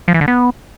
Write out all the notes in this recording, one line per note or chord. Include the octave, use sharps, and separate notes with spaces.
F3
E3
D3
B3